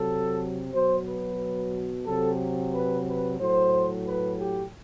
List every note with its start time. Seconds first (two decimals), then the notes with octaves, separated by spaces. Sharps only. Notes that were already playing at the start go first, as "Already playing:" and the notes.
Already playing: C3 F#3 A4
0.72 B2 F#3 C5
1.05 B4
2.06 C3 F#3 A4
2.73 B4
3.06 B4
3.39 A2 F#3 C5
4.06 B4
4.40 G4